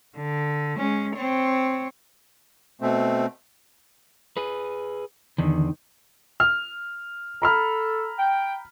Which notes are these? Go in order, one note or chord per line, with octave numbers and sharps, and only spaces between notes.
D3
G#3 C#4
C4 C#5
B2 A3 C4
G#4 B4
E2 D3 D#3
F6
A4 A#5 B5 F6
G5